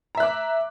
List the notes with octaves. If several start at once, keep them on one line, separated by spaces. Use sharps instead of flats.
E5 A#5 D6 F#6